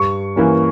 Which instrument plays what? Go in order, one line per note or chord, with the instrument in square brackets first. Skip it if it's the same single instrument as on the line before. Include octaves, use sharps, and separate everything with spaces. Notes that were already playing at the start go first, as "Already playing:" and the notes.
Already playing: [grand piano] G2 C#6
E3 A#3 C#4